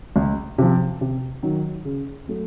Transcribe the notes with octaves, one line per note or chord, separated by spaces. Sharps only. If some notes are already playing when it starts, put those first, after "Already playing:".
C#2
C3 F3
C3
D#3 F#3
C#3
F#3 A3